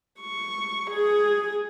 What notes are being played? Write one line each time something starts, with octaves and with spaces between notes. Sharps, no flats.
C#6
G#4